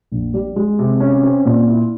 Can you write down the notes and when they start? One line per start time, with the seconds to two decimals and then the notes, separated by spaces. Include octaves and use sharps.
0.12 A#1
0.34 G3
0.56 G#3
0.79 C3
1.00 C#4
1.23 C4
1.45 A#2
1.68 E4